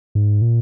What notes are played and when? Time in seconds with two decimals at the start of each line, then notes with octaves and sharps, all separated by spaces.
0.15 G#2
0.42 A#2